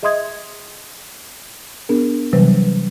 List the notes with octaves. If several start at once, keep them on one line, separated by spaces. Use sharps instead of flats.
G#4 D#5 E5 C6 D#6 G#6
B3 D4 G#4 A#4
C3 E3 F#3 G3 B4 C5